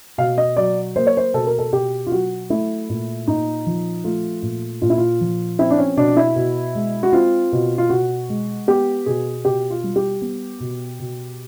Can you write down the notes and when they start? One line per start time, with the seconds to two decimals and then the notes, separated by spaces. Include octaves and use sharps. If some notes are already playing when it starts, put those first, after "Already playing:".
0.18 B2 F5
0.38 D#5
0.57 F#3 D5
0.96 A#3 C5
1.07 C#5
1.17 C5
1.34 B2 A4
1.47 A#4
1.59 A4
1.72 B2 G4
2.07 F4
2.11 F#3 F#4
2.50 A3 E4
2.89 A#2
3.27 A#2 D#4
3.66 F3
4.04 A3 F4
4.42 A#2
4.82 A#2 F4
4.90 E4
4.98 F4
5.21 F3
5.59 C4 E4
5.70 D4
5.78 C#4
5.97 B2 D4
6.17 E4
6.36 B2
6.75 G#3
7.03 F#4
7.13 C4 F4
7.52 B2
7.78 F4
7.90 B2 F#4
8.29 G#3
8.67 B3 G4
9.06 B2 G#4
9.45 B2 G4
9.70 F4
9.83 G3
9.96 G4
10.21 B3
10.60 B2
10.99 B2